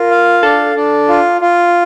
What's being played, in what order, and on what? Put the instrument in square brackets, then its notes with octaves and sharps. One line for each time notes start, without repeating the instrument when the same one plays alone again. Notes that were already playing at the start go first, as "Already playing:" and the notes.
Already playing: [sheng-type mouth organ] F4 [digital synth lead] A#4
[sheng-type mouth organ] F5
[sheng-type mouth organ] D4 [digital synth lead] A4
[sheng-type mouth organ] D4
F4
F4